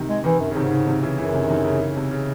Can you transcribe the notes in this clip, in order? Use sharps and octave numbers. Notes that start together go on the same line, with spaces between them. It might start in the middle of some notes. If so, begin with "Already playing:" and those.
Already playing: C3 D#3
G#3
C3 D#3 E3
F#2
C#3
G#2 C3 D#3
C3
C#3
C3 D#3
C#3 E3
F#2 C#3 E3
C3 D#3
C3 D#3
C#3
C#3
C3
C#3